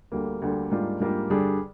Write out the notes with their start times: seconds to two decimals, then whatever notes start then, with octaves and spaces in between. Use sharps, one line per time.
0.12 D2 D3 G3 A#3
0.42 D2 D3 G3 A#3
0.71 G#2 G3 A#3 D4 F4
1.00 G#2 G3 A#3 D4 F4
1.30 G2 D3 G3 D4 G#4